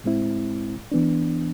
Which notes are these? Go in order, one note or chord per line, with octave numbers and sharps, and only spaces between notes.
A2 G#3 C4 E4
E3 B3 D4